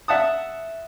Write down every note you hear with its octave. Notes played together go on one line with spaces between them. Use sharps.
E5 F#5 A5 D#6